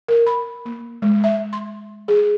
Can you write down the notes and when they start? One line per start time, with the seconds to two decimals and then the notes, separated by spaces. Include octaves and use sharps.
0.08 A#4
0.26 B5
0.65 A#3
1.02 G#3
1.24 E5
1.53 C6
2.08 G#4